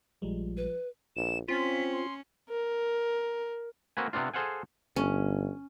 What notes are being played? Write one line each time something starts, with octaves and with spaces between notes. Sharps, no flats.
A#1 F3 G3 G#3
B4
A#1 E7
C4 C#4 F4 B6
C6
A#4
A#3 C4 F#4 B4 G#5
C3 B3 C4 D4 F4
G#4 A4 C5 F5 F#5 G#5
G1 C#4